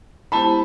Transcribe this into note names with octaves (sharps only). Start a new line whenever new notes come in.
G#3 B3 E4 G4 C5 A5 B5